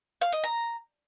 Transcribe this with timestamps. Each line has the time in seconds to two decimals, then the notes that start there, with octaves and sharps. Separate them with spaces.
0.22 F5
0.33 D#5
0.44 A#5